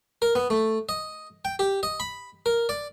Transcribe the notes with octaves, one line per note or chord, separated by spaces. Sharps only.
A#4
B3
A3
D#5
G5
G4
D#5
B5
A#4
D5